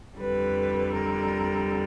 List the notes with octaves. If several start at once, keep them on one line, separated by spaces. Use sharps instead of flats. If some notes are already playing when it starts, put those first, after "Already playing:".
F2 D3 G3 B4
A#4